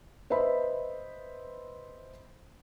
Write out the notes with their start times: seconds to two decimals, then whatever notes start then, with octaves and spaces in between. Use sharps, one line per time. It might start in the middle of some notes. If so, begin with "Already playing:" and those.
0.30 B4 C5 D#5 E5 B5